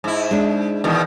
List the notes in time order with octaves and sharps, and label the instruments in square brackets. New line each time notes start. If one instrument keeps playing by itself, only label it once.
[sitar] G#2 E4
[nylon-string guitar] G#3 D4
[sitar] E2 B2 D#3